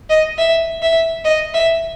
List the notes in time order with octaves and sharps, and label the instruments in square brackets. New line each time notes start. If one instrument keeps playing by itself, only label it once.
[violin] D#5
E5
E5
D#5
E5